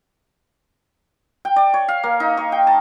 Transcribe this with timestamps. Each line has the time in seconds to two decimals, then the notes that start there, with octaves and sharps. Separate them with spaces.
1.45 G5
1.56 D5
1.74 C#5
1.88 F5
2.03 A#3
2.20 D#4
2.37 C#6
2.52 G5
2.67 A5